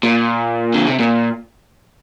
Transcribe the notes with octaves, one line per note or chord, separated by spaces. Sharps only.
A#2
D3
C3
A#2